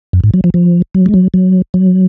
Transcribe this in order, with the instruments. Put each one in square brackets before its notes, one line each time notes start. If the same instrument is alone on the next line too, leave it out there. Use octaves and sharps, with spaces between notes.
[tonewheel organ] F#2
G#2
F#3
F3
F3
F#3
G#3
F#3
F#3
F#3